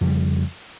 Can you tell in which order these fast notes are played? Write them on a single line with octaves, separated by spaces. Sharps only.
F2 C#3 G3